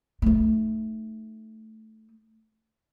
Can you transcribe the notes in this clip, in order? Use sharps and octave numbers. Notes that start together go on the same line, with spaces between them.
A3 D#4